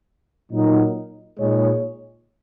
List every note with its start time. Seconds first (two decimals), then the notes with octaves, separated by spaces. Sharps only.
0.49 A#2 F#3 D#4 A#4
1.39 A#2 G#3 D#4 G#4 C#5